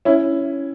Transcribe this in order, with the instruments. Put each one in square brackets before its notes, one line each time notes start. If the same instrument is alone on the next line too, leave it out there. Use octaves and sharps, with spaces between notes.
[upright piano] C#4 E4